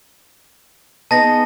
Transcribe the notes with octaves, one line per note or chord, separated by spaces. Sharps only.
B3 D#4 G#4 A5 A#6